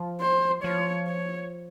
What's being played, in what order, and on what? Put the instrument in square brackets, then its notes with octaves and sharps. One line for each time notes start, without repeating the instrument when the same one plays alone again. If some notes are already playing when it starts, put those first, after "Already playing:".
Already playing: [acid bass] F3
[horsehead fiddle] C5
[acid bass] F3 [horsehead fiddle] C#5
[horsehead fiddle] C#5